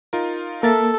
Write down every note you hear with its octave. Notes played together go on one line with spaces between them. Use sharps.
D#4 F4 A#4
A#3 A4 A#4 E5 A6